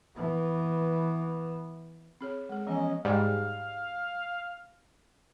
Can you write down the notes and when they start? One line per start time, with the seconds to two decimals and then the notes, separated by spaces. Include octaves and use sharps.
0.16 E3 B3
2.21 C4 G#4 C#5
2.49 G#3 G#4
2.67 E3 F3 B3 C#4 D#5
3.05 G#2 G3 F5